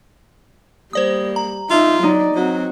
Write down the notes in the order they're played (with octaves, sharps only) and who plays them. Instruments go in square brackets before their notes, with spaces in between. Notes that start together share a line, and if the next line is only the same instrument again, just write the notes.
[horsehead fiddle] G3 [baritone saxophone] A#3 [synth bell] C5 D5 D#6
[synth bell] A#5
[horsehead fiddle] D#4 E5 [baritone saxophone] F4
[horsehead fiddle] F#3 D5 [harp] D#4
[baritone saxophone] F#3 [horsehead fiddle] C4 F#4